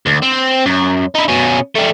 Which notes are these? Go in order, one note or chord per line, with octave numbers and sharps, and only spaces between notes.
D2
C4
F#2
D#4 E4
B2 C#4
G3 A3